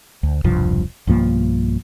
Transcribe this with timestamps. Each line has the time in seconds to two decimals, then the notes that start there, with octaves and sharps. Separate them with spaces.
0.23 D2
0.44 E1 C2 G2 F3
1.07 B1 G2 F3 A#3